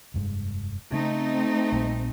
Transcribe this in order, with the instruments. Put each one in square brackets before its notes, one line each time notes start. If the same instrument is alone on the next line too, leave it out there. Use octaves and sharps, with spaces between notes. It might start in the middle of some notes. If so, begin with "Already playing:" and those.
[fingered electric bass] F1 G2 G#3
[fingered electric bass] C#3 [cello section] A3 C4 D#4
[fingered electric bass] A#1 A#2 G3